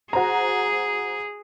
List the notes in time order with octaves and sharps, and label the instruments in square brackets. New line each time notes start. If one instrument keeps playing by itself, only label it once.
[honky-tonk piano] F#4 C5 A#5 [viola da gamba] G#4